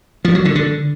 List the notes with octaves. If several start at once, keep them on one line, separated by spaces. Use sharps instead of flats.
F3
F#3
D3
D3